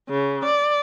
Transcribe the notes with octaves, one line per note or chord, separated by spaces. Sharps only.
C#3
D5